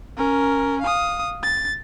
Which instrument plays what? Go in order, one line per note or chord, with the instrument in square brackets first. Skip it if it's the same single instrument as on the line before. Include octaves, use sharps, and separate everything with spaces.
[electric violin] C#4 A#4
F5 D#6
A6